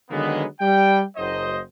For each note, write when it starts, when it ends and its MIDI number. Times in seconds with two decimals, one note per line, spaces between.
0.11 0.44 50
0.11 0.44 51
0.11 0.44 54
0.11 0.44 56
0.11 0.44 58
0.11 0.44 59
0.61 1.03 55
0.61 1.03 79
1.17 1.60 30
1.17 1.60 54
1.17 1.60 72
1.17 1.60 75